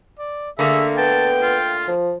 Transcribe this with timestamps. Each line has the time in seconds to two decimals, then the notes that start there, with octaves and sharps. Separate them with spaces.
0.19 D5
0.59 D3 A3 A#3 G#4 E5
0.97 B3 G5 A5
1.42 F4
1.88 F3